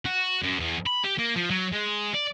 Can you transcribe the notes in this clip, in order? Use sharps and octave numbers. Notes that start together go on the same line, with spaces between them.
F#4
F#2
E2
B5
G4
A#3
F3
F#3
G#3
D5